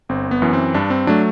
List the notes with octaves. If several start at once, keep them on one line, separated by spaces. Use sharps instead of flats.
G1 C4
B3
F#2 E3
C4
G2 D4
C4
F#3 A3 D4